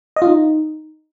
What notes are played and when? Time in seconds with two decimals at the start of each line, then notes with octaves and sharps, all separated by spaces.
0.16 D#5
0.22 F4
0.27 D#4